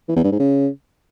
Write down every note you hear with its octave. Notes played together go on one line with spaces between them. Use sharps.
E3
E2
G2
G#2
C#3